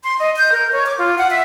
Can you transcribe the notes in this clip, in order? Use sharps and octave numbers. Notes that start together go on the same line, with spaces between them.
C6
D#5
G6
A#4
C#5
D6
F4
F#5
E5